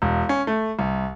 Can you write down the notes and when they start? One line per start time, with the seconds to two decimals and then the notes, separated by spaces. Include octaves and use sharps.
0.02 E1
0.29 C#4
0.47 A3
0.79 C2